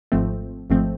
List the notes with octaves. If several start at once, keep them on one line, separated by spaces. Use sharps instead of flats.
G#1 G#2 F3 A3 C4
G#1 G#2 F3 A3 C4